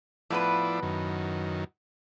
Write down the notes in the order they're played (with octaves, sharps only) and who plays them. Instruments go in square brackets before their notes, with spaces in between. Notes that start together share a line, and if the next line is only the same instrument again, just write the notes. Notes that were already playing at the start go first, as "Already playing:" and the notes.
[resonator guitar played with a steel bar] A2 B3 B4 [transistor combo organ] F3 E4 D5
[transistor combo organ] F#2 D#3